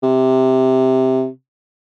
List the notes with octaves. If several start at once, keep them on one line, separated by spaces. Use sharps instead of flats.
C3